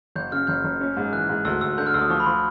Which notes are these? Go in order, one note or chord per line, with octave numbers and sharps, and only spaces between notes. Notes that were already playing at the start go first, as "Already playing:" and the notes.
F#1 G6
C#3 F6
F#1 G6
F#1
C#4
G#2
E3 F#6
G#2
D2 E6
D2 E6
D3 G6
F6
D2 E6
D#6
F3 C#6
B5
F3 C6